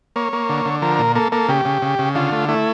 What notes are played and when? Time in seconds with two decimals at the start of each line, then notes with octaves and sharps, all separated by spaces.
0.16 A#3 C#5
0.33 A#3
0.49 D3
0.65 D3
0.82 F3 A#4
0.99 A#2
1.15 A#3 A4
1.32 A#3 A4
1.48 C#3 G4
1.65 C#3
1.82 C#3
1.99 C#3
2.15 D3 F4
2.32 A3
2.49 A3 E4